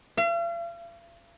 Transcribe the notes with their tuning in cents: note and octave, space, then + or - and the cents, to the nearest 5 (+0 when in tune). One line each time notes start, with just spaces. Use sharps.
F5 -45